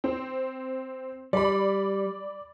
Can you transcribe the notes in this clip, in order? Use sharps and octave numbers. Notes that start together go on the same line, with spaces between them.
C4
G3 D5 B5